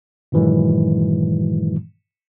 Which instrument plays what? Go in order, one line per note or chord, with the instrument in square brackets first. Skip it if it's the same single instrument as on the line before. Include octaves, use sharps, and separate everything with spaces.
[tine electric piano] G2 A#2 D#3 E3 F#3 G#3